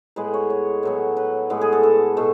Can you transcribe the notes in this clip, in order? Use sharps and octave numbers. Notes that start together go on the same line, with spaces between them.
A2 G#3 B3 B4
C#5
C#5
A2 F#3 B3
B4
A2 G#3 B3
G#4
A4
A4
B2 A3